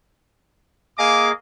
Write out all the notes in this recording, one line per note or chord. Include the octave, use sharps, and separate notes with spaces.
A#3 G#4 D#5 F5 G#5 D6